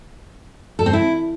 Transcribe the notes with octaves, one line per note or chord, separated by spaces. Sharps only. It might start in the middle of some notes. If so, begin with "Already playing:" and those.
A4
C4
E4